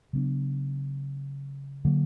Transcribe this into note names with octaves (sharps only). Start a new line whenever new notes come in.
C#3 F#3 B3 D4
D3 F#3 A#3